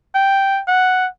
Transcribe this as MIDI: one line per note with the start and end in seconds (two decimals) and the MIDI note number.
0.15 0.61 79
0.68 1.08 78